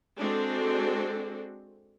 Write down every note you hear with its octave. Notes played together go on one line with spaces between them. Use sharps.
G#3 C4 D4 F#4 A4